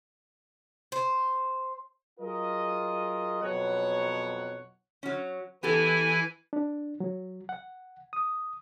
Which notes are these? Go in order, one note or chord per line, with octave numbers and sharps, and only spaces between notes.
C5
F#3 F4 G#4 A#4 D#5
B1 F2 B2 F#3 C#5 F#5
F#3 C#4
E3 B3 E4 G4 A4 G#5
D4
F#3
F#5
D#6